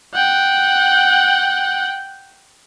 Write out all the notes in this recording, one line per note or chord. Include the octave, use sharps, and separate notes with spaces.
F#5 G5